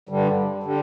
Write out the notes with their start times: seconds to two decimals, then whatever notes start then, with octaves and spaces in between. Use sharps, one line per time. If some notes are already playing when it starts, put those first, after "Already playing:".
0.09 G2 D3 G3
0.63 D3 G3